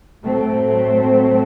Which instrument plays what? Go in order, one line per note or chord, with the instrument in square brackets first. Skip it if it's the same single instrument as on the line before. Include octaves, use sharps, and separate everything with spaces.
[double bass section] A2 F#3 A3 C4